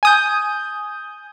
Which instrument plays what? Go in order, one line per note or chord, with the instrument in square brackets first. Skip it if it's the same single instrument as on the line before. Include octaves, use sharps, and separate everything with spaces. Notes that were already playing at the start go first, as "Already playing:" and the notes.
[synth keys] G#5 D#6 G6